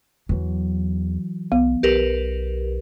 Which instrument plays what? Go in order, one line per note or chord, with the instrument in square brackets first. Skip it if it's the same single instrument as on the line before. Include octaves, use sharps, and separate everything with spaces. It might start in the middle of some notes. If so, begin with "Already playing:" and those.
[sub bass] E2 [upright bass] E3 F#3
[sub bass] B1 [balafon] B3
[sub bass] B1 [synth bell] G4 A#4 B4